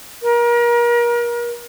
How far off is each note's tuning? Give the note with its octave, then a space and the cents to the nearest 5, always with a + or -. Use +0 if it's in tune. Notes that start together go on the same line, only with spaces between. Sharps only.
A#4 +35